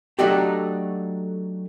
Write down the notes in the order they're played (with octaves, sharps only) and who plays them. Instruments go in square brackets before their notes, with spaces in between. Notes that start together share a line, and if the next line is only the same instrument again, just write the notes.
[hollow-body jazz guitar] F#3 A3 D4 D#4 F#4 G4